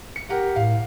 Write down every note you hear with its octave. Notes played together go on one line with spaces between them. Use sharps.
C#7
G4 A#4 F#5
A2 F5